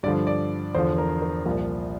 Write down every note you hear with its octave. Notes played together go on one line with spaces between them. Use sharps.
G2 D3 F3 D5
D5
E2 D3 F3 C5
A#4
A#4
C2 A#2 F3